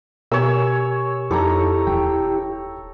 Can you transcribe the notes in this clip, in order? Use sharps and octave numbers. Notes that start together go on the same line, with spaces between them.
B2 G4 A#4 C#5 G#5 E6
F2 D#4 E4 G4 A4 C#5 A#5
D#1 G5